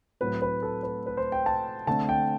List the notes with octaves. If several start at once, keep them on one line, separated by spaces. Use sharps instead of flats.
A2 F#3 A3 C4 B4
B4
A4
B4
B4
C5
G5
A5
D3 A3 C4 A5
G5